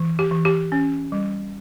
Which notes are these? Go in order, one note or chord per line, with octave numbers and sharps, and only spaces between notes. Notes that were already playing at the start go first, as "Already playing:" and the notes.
Already playing: E3
G4
E3
G4
C#4
G3